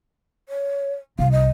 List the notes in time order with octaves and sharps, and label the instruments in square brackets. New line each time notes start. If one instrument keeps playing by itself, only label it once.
[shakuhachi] C#5
[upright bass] C2 [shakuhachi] F5
[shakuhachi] D#5